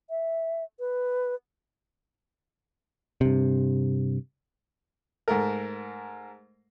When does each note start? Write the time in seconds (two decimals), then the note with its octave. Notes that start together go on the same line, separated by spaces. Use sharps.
0.10 E5
0.79 B4
3.21 G2 C3
5.28 G#2 A3 A#4